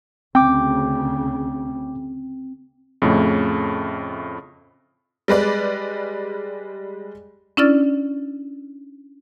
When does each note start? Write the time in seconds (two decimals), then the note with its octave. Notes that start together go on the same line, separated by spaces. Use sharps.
0.35 D2 C#3 C4 G5 D6
3.02 F2 A2 C#3 A3
5.28 G3 G#3 B4 D5
7.57 C#4 D4 E4 D5 F6 A6